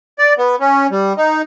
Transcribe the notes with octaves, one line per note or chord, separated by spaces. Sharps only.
D5
B3
C#4
G3
D#4